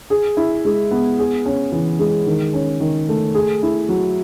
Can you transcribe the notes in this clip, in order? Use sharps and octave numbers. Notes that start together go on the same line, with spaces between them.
G#4
E4
G#3
B3
G#4
C#4
E3
G#3
D#3
C#4
D#3
A3
G#4
E4
F#3